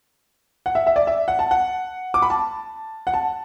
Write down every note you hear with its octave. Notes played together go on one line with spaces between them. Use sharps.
F#5
E5
E5
D5
E5
F#5
A5
F#5
D6
B5
A5
F#5
A5